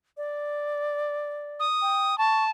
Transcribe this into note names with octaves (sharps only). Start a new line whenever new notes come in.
D5
D#6
G5
A5 C#6